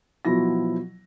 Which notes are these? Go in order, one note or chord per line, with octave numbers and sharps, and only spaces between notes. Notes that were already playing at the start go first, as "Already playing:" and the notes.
B2 F3 F#3 E4 A#6